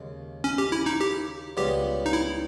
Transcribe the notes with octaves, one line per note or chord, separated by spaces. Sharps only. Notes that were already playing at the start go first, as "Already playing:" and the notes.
Already playing: D#2 C#3 G#3
C#4
G4
E4
D#4
G4
C#2 C#3 G3 B3 G4
D#4
E4